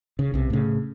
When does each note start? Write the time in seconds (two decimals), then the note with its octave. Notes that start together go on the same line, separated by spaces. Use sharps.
0.19 C#3
0.34 B1 C3
0.50 A2 C#3